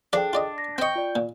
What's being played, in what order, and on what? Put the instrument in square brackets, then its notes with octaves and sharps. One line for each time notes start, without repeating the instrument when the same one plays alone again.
[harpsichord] F3 D5 [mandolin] D4 [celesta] G#4 A4 G5
[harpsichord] F4 D5 D#5
[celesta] A#6
[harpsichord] C4 D#5 [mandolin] G5 C#6
[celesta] F4 D5
[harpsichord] A#2